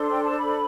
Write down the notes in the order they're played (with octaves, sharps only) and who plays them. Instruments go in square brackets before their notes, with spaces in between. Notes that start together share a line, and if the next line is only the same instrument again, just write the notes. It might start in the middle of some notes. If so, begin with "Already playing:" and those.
Already playing: [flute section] D4 A4 C5 C6
G5
A5
B5